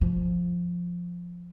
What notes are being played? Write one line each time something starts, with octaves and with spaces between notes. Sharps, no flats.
F3